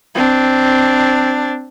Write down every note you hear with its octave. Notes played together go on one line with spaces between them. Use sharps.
C4 D4